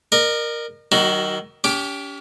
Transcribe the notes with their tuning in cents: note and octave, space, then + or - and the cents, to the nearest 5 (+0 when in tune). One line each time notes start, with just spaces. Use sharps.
A#4 +0 D#5 -45
D#3 +0 F#3 +45 F#4 +10
C#4 +40 G4 +0 D6 +0